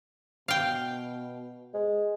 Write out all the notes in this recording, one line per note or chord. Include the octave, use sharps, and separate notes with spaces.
B2 F5 G5
G#3